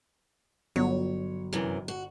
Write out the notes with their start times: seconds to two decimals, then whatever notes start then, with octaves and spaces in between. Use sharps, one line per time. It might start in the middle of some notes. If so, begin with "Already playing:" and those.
0.76 G1 F#3 C#5
1.53 F#2 C3 E3
1.88 F#4